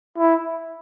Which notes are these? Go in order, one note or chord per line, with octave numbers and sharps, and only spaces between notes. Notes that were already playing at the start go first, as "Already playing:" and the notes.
E4